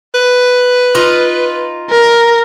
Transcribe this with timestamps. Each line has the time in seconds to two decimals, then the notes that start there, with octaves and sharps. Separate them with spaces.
0.14 B4
0.95 D#4 F4
1.91 A#4